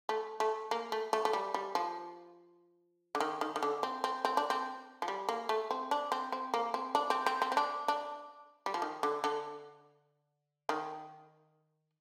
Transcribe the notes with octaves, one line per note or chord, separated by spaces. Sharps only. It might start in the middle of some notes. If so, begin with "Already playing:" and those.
A3
A3
A#3
A3
A3
A3
G3
G3
F3
D3
D#3
D#3
D#3
D3
C4
C4
C4
D4
C4
F3
G3
A#3
A3
C4
D4
C4
C4
A#3
C4
D4
C4
C4
C4
C4
D4
D4
G3
F3
D#3
D3
D3
D#3